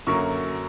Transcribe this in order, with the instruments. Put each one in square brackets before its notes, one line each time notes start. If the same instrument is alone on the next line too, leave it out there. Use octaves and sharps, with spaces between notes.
[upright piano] F#2 D3 F#3 A#3 C#6